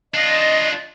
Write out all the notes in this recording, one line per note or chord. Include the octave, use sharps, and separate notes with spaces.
D4 F4 D#5